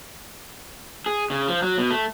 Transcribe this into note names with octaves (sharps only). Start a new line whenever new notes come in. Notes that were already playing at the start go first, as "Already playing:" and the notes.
G#4
C#3
F3
F#3
B2
A3